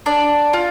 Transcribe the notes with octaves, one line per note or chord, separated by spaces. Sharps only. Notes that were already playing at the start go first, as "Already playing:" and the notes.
D4 D5
F4